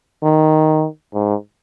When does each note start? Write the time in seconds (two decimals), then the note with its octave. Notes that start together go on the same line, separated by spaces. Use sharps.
0.23 D#3
1.13 G#2